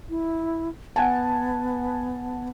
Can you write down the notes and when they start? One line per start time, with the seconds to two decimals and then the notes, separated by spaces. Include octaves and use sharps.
0.10 E4
0.96 B3 F#5 G#5 A5